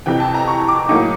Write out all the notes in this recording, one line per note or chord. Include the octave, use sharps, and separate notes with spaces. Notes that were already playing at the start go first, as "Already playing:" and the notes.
F2 C3 E3 G5
A5
A#5
C#6
D6
A2 F#3 A#3 D#4